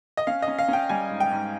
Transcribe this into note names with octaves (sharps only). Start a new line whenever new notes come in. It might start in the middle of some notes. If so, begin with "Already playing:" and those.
D#5
C#4 F5
D#5
C#4
F5
C#4 G5
G3 G#5
G#2
G5
G#2